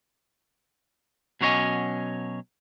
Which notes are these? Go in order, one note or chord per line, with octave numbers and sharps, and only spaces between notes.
B2 F#3 C#4 C#5 D#5 G#5